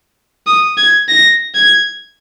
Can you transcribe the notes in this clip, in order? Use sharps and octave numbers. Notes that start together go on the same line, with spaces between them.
D#6
G#6
A#6
G#6